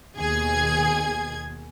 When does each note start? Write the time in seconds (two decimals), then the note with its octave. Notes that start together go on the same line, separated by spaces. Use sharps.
0.17 D#2 B2 G#4 G#6